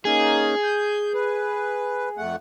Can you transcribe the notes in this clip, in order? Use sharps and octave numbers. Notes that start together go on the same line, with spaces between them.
A#3 C#4 D#4 G#4
G6
B4
F2 A3 F#5